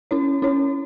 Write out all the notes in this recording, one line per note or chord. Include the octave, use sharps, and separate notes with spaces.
C#4 E4 C#5
C#4 E4 C#5